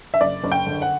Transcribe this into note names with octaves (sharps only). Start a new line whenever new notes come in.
E5
F#1 D5
F#1
G5
D3
F#5